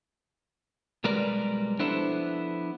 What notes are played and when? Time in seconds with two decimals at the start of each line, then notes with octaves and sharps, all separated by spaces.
1.04 B1 G3 G#3 A#4 B4 D5
1.79 F3 B3 D4 E4 A4 C5